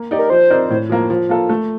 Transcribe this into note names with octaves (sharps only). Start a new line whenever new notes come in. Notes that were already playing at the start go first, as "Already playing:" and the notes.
Already playing: A#3
D#4 G4 D5
A#4
F3 C5
C4 D#4 A#4 D5
A2
F3 A#3
F3
A#3 F4 A4
A3